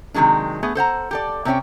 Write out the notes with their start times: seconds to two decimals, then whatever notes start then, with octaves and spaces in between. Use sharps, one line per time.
0.14 C3 D#3 F#3 G#3 D4
0.63 A3 B3 G#4
0.75 A4 C5 F#5 A#5
1.11 G4 A4 D5
1.45 C3 C4 C#4 G4 C#5 G5